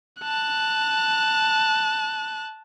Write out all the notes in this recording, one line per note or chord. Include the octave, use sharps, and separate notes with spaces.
A5 F#6